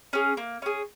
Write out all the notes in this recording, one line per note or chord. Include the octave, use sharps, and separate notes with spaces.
C#4 G#4
A#3
C#4 G#4